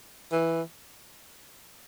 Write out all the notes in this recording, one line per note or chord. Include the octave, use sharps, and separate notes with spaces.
E3